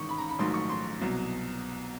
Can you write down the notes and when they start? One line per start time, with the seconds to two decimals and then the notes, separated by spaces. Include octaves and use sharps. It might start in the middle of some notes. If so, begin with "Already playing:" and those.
Already playing: A1 G#2 D#3 C#6
0.09 B5
0.18 A#5
0.29 B5
0.39 A#1 G#2 D#3 F#3 A3 C6
0.54 C#6
0.69 C6
1.00 C2 B2 F#3